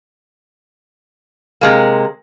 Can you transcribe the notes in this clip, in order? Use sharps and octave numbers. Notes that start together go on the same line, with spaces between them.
C3 G#3 A#3